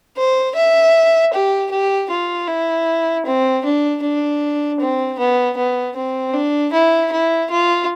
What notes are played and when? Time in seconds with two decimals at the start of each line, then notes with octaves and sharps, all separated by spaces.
0.17 C5
0.55 E5
1.33 G4
1.71 G4
2.10 F4
2.48 E4
3.26 C4
3.65 D4
4.02 D4
4.80 C4
5.19 B3
5.57 B3
5.96 C4
6.33 D4
6.72 E4
7.12 E4
7.50 F4